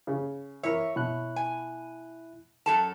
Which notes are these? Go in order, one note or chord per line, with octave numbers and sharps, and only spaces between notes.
C#3
E3 E4 A#4 C#5 E5
B2 E4 F#6
G#5
F#2 A4 A5